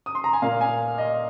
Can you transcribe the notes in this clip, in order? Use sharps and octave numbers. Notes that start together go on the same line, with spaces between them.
D#6
C6
A#5
G#5
A#2 A#3 F5
G#5
D#5